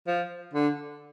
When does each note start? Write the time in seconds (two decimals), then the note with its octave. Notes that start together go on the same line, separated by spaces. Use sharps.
0.07 F3
0.54 D3